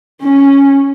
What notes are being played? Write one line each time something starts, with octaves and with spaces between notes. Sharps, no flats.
C#4